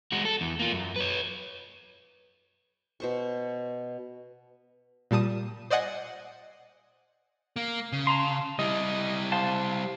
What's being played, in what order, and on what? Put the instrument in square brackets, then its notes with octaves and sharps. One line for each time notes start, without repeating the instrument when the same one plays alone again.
[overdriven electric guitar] G#3 F#4
A4
E2
A#3 F4
F#2
B4 C#5
[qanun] B2 C5 C#6
[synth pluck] A#2 G3 A5 D#6 D#7
C5 D5 D#5 F#5 G#5 C7
[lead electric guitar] A#3
C#3
[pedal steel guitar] A5 A#5 C6
[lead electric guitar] G3 E4 [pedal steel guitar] D#5
[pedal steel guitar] C5 F5 A5